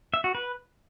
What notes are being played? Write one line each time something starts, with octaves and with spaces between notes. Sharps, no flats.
E5
F#4
B4